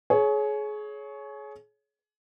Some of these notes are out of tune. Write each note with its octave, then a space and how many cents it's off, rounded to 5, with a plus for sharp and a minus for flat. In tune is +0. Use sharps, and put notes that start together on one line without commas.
G#4 +30 C#5 +0